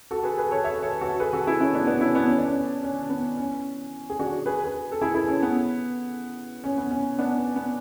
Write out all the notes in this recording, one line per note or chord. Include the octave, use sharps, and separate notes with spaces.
F#4 A4
G#4 B4
G#4 B4
A4 C#5
C#5 E5
A4 C#5
F#4 A4
G#4 B4
F#4 A4
E4 G#4
C#4 E4
B3 D4
B3 D4
C#4 E4
B3 D4
C#4
D4
C#4
C#4
B3
C#4
G#4
D4 F#4
G#4 B4
G#4 B4
A4
E4 G#4
E4 G#4
C#4
B3
C#4
B3
C#4
B3 D4
B3
B3